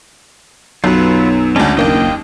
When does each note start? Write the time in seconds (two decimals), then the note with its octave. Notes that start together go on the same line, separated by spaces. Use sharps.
0.84 B1 F#2 F#3 F4 B4
1.56 D2 G#3 C#4 D4
1.77 F#1 D#2 A#3 D4 D#5 G5